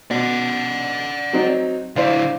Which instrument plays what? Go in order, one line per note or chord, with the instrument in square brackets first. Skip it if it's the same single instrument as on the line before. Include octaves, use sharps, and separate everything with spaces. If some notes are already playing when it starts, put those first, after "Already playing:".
[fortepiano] B2 [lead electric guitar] D5 F#5
[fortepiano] F#3 C4 D#4
[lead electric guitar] D3 E4 [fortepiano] C5 D5 F5